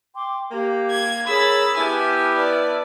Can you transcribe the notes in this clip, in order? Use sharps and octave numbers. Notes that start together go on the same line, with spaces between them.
G5 C6 D6
A#3 G4
G#6
G#4 A#4 C#5 B5 E6 A6
B3 E4 G4 G#5 A5 F6
B4 D5